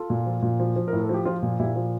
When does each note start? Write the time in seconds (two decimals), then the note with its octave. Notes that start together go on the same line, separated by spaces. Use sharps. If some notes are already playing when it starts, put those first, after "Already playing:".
Already playing: F4 A4
0.10 A#2
0.26 F3
0.42 A#2
0.60 F3
0.76 F3
0.88 A2 A#4
1.00 A4
1.09 F3 G4
1.25 F3 F4
1.43 A#2
1.59 A#2 E4 G4
1.76 F3